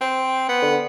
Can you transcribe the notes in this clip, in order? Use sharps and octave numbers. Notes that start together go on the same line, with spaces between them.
C4
B3
D3